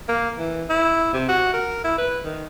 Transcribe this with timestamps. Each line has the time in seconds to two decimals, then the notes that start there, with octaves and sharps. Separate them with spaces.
0.08 A#3
0.38 E3
0.69 E4
1.14 C3
1.29 F#4
1.53 A#4
1.84 E4
1.98 B4
2.25 D#3